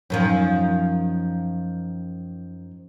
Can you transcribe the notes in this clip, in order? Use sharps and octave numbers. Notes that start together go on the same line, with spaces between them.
F#2 D#3 F3